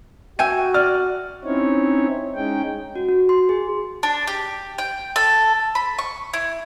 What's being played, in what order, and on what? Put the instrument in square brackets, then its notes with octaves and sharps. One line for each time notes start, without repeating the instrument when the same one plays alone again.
[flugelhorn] F#4 [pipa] E5 G5 G#5 [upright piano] D#7
[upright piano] D5 [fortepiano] F6
[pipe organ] C4 C#4 D#4 E4 C#5
G#3 C#4 D#4 G5
[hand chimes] F#4
F#4
C6
G#4
[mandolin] D4
G4
G5
A4
B5
C#6
E4